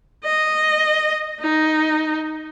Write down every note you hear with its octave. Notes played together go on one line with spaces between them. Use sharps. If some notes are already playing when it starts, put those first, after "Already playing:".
D#5
D#4